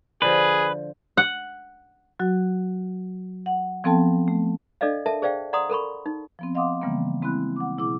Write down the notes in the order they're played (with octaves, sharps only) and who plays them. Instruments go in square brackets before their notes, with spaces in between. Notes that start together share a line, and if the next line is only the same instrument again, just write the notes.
[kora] D3 F3 [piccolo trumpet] G#4 [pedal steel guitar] B4
[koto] F#5
[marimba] F#3 F#4
F#5
F3 B3 C4 A4 G5 A5
A3
[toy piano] D4 A4 D5 D#5 F5
A4 A#4 E5 A5
G#4 C5 D5 F5 G5
D5 F#5 A#5 C6 D#6
A4 A#4 B5 C#6
D#4
[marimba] F3 B3 C4
D#5 F5 F#5 C6 D6 D#6
C#3 E3 G3 A#3 B3
G#3 C4 E4 B5 F#6
F#5 D6
B2 E4 G#4 D6